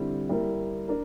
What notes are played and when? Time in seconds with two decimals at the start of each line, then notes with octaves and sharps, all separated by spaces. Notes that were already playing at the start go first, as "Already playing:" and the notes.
Already playing: D3 G3 C4 E4
0.29 G3 A#3 E4 A#4
0.88 D4 A#4